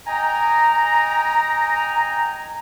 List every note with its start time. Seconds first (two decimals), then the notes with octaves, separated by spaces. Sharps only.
0.07 D#5 G5 G#5 A#5